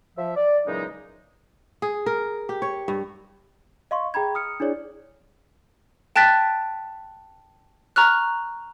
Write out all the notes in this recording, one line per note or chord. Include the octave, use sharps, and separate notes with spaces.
F3 E5
D5
A#2 C#3 E3 F#3 G#3 D#4
G#4
A#4
G4
C#5
G2
D#5 F5 C6 C#6
G#4 G5 A#5 B5 G#6
D#6 F6 C#7
D4 E4 G#4 C#5 D5
G5 A5 F#6 A6 B6
A#5 C#6 F6 F#6